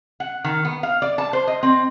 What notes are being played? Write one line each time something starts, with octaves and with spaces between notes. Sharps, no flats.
F#5
D#3
B3
F5
D5
A5
C5
D#5
C4